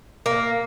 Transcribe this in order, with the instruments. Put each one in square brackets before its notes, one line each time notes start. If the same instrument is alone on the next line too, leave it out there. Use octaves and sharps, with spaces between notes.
[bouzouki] A#3